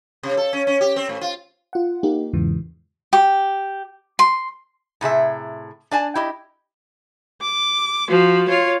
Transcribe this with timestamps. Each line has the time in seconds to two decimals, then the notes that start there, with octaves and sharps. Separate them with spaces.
0.23 C3
0.37 A4
0.53 C#4
0.67 C#4
0.81 G4
0.96 C4
1.09 A2
1.21 F4
1.73 F4 F#5
2.03 A#3 D#4 G4
2.33 E2 G#2 C#3 E3
3.13 G4
4.19 C6
5.01 A2 C3 G#4 E5
5.91 D4 D5 G#5 A5
6.15 E4 G4 D#5
7.42 D6
8.09 F3 F#4
8.48 F4 C#5